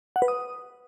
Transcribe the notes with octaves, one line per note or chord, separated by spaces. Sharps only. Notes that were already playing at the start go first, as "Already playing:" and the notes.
F#5
B4
D#6